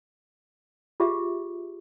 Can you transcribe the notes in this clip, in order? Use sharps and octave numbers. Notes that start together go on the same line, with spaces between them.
F4 G4 G#4 E5